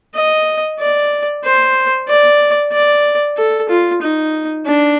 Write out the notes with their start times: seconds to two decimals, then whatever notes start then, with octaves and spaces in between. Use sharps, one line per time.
0.15 D#5
0.80 D5
1.44 C5
2.08 D5
2.72 D5
3.37 A4
3.69 F4
4.02 D#4
4.67 D4